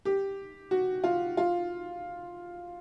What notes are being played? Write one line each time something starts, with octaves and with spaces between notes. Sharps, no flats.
G4
F#4
F4
F4